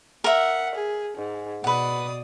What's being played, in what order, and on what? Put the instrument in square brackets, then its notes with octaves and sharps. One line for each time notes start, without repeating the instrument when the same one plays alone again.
[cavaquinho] A#4 E5 [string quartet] F#5
[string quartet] G#4
G#2
[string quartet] B2 D5 D#6 [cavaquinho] B4 F#5